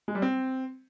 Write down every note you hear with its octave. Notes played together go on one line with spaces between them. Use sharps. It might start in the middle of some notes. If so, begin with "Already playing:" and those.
G#3
G3
C4